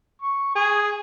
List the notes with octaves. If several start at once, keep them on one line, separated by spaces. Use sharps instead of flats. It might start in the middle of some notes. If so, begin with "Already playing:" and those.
C#6
G#4